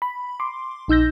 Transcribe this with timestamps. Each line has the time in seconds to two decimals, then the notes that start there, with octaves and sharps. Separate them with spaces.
0.02 B5
0.40 C6 D6
0.88 A#1 D#4 E6 G6 A#6